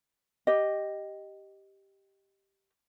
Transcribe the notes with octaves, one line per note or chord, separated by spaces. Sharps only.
G4 D#5